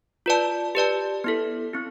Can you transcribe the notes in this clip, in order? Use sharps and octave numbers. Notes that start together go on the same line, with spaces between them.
F4 B4 D5 A5
G4 B4 D5 A5
B3 E4 A4
C4 E4